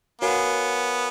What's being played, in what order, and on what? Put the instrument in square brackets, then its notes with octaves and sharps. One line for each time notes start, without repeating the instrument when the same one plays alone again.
[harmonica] B3 [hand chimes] F#4 A#4 C#5 F5 G#5